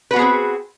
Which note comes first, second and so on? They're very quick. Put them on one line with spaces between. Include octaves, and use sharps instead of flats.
B4 F#4 B3 G#4 C4